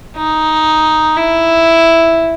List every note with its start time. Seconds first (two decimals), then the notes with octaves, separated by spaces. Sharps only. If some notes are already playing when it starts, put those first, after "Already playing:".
0.17 D#4
1.17 E4